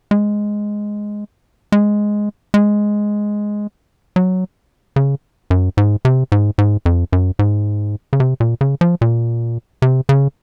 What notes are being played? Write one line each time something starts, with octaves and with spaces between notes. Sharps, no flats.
G#3
G#3
G#3
F#3
C#3
F#2
G#2
C3
G#2
G#2
F2
F#2
G#2
C#3
C3
A#2
C#3
F3
A#2
C3
C#3